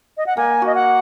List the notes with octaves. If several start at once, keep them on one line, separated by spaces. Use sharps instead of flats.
D#5
F#5
A#3 G#5
F#4 D#5
F#5